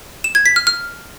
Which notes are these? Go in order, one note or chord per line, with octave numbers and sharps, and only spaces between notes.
E7
G#6
B6
F6
F6